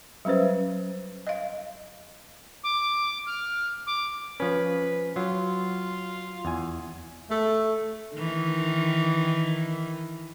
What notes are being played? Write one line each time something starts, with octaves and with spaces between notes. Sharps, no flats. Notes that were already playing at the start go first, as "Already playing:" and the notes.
F#3 G3 C#4 B4 C5
D#5 F5
D6
F6
D6
F3 C#4 B4
F#3 F4
E2 G#5
A3
D#3 E3